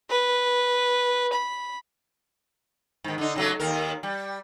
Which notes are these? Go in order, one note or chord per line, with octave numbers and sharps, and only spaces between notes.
B4
B5
G#2 D#3
D3 D#4
C#3 F#3 A3
D#2 A#4
G3